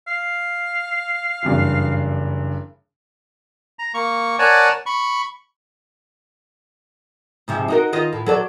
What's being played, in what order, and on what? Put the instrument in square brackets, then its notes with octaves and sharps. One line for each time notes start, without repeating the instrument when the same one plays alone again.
[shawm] F5
[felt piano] F#1 G2 E3
[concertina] A#5
A#3 C#6
A#4 C#5 D5 F#5 G#5 A5
B5 C#6
[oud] G#2 C3 F3
D#4 F#4 A#4
D#3 F4 D#5
A2
F#3 A4 D5